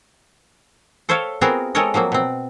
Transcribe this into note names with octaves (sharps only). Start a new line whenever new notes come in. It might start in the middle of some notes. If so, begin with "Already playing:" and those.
A4 C5 C#5 E5 F5 G5
B3 C4 F4 F#4 G#4 A#4
G#3 C4 A4 A#4 C#5 D#5
F3 F#3 A#3 C4
B2 C4